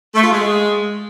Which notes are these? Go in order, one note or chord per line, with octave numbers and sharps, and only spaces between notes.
A3
F4
G#3